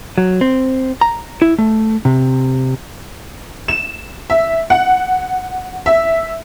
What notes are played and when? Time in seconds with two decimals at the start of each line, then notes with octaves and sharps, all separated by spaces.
0.18 F#3
0.41 C4
1.01 A#5
1.42 E4
1.58 A3
2.05 C3
3.68 E7
4.30 E5
4.70 F#5
5.86 E5